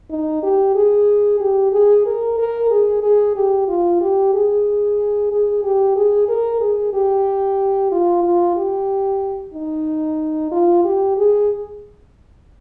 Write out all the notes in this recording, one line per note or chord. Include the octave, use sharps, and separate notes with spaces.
D#4
G4
G#4
G4
G#4
A#4
A#4
G#4
G#4
G4
F4
G4
G#4
G#4
G4
G#4
A#4
G#4
G4
F4
F4
G4
D#4
F4
G4
G#4